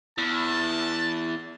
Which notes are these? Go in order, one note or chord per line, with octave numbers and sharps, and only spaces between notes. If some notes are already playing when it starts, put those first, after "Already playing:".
E2 A5